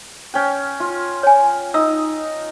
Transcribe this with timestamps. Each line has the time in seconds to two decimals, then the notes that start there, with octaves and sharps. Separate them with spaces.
0.34 C#4 G5
0.80 F4
1.23 C#5 G#5
1.74 D#4 E6